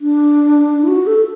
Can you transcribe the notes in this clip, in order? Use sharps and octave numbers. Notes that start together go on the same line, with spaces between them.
D4
E4
F#4
A4